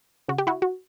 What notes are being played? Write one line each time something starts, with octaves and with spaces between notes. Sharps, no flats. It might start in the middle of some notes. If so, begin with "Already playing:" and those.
C#3 F#4
G4
E4 F#4
F#4